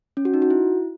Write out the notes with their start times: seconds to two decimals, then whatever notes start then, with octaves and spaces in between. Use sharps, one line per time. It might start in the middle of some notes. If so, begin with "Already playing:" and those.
0.17 C#4
0.25 F#4
0.34 D#4
0.42 F#4
0.50 E4